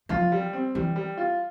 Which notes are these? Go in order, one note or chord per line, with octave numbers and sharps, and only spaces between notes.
F3 F4
G3
C4
E3 G3
G3
F4